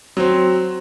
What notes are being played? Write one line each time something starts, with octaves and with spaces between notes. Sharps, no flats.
F#3 C4